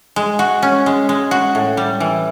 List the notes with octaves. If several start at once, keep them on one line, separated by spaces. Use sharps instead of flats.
G#3
F#4
C#4
G#3
G#3
F#4
A2
G3
E3